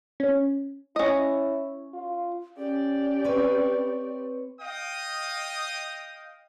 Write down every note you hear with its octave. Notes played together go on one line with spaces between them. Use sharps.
C#4
C#4 E4 D#5
F4
C#4 G4 D5
C4 B4 C#5
D#5 F5 G5 D#6